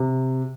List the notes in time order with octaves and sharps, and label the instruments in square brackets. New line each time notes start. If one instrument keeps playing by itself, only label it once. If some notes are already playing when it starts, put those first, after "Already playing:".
Already playing: [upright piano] C3